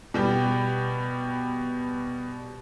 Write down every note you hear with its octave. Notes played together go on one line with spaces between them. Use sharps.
B2 G3 G4